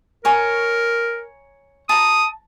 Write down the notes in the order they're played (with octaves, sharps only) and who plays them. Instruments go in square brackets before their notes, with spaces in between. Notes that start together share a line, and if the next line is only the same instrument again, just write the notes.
[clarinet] A#4 [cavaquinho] C#5 G#5 A#5
[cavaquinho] A5 A#5 [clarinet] D#6